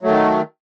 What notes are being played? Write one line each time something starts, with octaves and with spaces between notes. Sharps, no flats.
D#3 F#3 A3